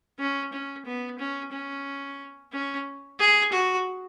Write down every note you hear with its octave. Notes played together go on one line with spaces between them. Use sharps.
C#4
C#4
B3
C#4
C#4
C#4
G#4
F#4